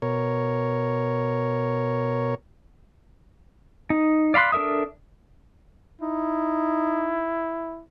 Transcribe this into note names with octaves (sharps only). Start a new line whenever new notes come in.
B2 A#4 C#5
D#4
D5 F5 B5 C6 F#6
D4 A4 A#4 E5 D#6
D#4 E4